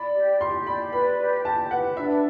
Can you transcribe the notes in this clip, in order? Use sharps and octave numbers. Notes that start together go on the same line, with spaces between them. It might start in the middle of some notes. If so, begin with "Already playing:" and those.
Already playing: D5 B5
G4
G4 C6
D5 B5
B4 B5
G4
G4 A5
B4 F#5
D4 E5